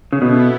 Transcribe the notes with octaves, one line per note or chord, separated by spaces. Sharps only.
C#3
B2 B3 E4 A4